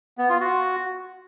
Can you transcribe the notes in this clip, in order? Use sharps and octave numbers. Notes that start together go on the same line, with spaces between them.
B3
F4
F#4